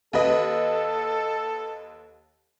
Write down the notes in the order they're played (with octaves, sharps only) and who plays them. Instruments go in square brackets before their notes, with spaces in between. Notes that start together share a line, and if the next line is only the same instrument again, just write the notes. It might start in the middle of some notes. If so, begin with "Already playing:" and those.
[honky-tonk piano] D#2 B4 D#5 [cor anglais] A4